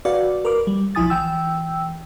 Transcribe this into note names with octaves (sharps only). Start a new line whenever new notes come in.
F#4 B4 D5 F5
A#4 B4 D6
G3
B1 F3 E4 G#5 D#6 A6
E3 G5 E6